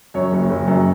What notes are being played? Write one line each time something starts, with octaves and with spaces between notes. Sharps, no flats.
F#2 C#5
F#1
F#1
F#2